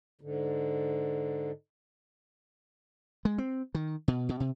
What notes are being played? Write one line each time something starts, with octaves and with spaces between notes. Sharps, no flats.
G#2 D3
G#3
C4
D#3
B2
B2
C3